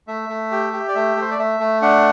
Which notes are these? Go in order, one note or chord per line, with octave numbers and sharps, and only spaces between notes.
A3 E5
A3
G4
G4
D5
A3 E5
A3 C5
D5
A3 E5
A3
D4 F#5